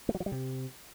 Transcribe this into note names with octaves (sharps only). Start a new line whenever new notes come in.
A3
F#3
F3
G3
C3